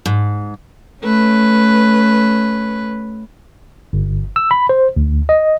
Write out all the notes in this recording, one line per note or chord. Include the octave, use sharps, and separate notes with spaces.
G#2
A3 C#4 B4
G1
E6
B5
C5
D2
D#5